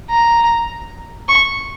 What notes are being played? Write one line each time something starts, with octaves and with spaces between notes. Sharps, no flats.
A#5
C#6